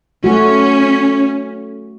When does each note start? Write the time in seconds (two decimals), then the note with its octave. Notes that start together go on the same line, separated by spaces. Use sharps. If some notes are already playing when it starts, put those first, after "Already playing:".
0.24 A3 C#4 F#4